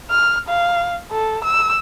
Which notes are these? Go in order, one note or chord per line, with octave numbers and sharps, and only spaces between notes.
F6
F5
A4
E6